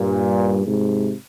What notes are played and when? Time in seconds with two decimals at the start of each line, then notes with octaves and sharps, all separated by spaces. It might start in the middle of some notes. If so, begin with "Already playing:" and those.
Already playing: G2 A#2
0.66 G#2 C3